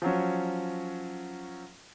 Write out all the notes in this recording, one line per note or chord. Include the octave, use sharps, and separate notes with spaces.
F3 F#3 C#4